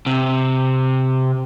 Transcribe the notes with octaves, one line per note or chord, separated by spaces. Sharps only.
C3